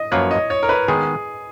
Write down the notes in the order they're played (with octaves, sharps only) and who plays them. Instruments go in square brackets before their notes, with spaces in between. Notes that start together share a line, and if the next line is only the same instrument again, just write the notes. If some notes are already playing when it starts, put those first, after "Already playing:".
Already playing: [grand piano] D#5
[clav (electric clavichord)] F#2 F3 A#3 F4 B4 [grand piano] C#5
[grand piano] D#5
C#5
A#4
B4
[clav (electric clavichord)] D#3 G#3 B3 D#4 [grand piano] G#4